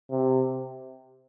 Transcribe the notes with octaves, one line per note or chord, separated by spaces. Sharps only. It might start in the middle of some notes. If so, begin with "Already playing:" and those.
C3